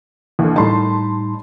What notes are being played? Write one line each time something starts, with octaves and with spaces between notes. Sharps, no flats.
D#2 D3 E3
A2 G3 D#4 A5 B5 C6